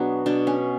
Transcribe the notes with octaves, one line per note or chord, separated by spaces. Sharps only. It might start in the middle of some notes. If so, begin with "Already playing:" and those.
Already playing: B2 F#3 B3 D4 F#4 G#4
B2 D4
C#4